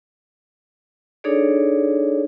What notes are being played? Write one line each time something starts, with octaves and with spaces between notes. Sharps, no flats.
D4 D#4 G#4 A4 C#5 D5